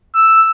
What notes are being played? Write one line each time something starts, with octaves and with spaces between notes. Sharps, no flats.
E6